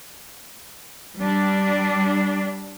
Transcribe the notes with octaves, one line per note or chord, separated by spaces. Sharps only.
G3 D4